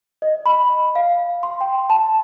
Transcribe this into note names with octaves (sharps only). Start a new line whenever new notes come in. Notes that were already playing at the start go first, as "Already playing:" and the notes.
D#5
B5
F5
C6
G5
A5